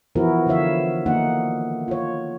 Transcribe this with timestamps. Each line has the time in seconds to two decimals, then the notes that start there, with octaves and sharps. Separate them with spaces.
0.15 E3 F3 B3 E4 F#4 A#4
0.47 D3 F3 C#5 E5 F5
1.06 D#3 A#3 D#4 F#5
1.88 F4 C#5